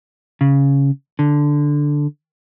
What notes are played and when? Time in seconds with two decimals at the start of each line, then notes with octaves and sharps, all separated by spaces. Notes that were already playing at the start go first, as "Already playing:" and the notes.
0.41 C#3
1.19 D3